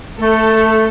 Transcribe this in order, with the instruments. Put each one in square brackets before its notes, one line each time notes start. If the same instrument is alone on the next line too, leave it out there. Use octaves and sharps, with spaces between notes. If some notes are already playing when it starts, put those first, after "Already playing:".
[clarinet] A3 [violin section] A4